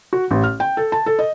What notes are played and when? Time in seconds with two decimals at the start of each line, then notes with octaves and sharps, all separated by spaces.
0.13 F#4
0.31 A1
0.44 F6
0.60 G5
0.77 A4
0.92 A5
1.06 A4
1.19 D#5